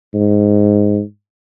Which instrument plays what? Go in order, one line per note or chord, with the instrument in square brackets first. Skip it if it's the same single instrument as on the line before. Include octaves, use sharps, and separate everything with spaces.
[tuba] G#2